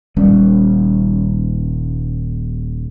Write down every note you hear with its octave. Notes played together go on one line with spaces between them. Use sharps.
D#1 G3 C#4